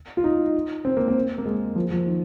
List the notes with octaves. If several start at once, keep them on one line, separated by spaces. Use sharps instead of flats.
F4
D#4
C4
A#3
C4
A#3
G#3
F3
F3
D#3